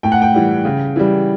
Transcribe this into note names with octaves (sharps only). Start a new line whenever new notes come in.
A2 G5
F#5
G5
E3 G3
C#3
E3 G3